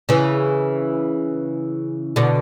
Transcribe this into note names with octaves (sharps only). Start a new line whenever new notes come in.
C#3 E3
B2 D3